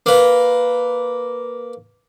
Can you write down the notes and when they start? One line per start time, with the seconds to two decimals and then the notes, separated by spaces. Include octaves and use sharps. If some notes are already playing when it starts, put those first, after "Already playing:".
0.06 A#3 B4